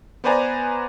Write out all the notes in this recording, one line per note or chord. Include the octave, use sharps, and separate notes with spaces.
B3 B4 C5 D5 G#5 A#5